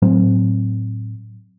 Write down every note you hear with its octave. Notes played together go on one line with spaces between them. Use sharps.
A2 F#3 C4